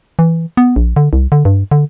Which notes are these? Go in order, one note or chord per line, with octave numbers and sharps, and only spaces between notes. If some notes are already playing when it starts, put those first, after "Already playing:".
E3
B3
A#1
D3
C2
D3
G2
D3